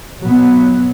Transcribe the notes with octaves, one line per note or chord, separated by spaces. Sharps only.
B2 F#3 B3